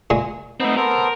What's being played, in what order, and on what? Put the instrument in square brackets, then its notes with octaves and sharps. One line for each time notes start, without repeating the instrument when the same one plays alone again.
[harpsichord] A#2 G#3
[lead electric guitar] A3 C4 [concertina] B3 D#4
[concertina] B3 A4 C5 [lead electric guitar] A#4